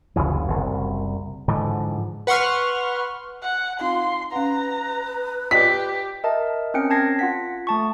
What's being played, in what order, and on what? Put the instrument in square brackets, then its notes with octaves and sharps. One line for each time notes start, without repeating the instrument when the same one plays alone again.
[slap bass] F#1 D2 C#3 E3
F#1 C2
G#2 D3 E3 F3
[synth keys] B4 F#5 C6 C#6 F6
[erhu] F#5
[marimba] C4 D#4 F4 [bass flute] F5 [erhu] C6
[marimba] C#4 F5 F#5 [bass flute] B4 [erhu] A#5
[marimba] F4 D5 D#5 [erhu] G4 [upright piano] B6
[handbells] A#4 D#5 E5 A5
C4 C#4 A#4 G5 C#7
C#4 A5 G#6 A#6 C7
F4 F#5 B6
A3 A5 C#6